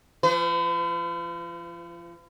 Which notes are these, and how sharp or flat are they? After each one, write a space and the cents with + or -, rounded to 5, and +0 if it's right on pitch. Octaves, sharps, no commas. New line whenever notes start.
F3 -30 B4 +45